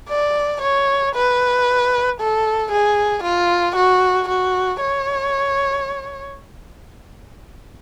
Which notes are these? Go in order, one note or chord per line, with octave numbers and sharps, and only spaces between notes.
D5
C#5
B4
A4
G#4
F4
F#4
F#4
C#5